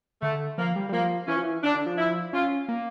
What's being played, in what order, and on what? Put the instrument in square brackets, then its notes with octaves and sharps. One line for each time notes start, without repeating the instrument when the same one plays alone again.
[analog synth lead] D3 [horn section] A3
[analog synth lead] F3 [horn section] A#3
[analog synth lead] G3
G3
[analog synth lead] F3 [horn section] A#3
[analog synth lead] E3 [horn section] C#4
[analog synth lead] F3
E3
[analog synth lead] D3 [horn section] D4
[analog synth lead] D3
F3
[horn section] E4
[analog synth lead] C#4 [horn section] F4
[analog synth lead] A#3